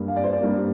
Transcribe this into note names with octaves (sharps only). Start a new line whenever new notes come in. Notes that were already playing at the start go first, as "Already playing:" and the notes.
Already playing: G2 G3 A#3
F5
D5
C5
D5
G2 G3 A#3